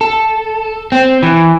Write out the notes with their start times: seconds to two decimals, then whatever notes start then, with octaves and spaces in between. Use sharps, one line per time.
0.01 A4
0.92 C4
1.23 E3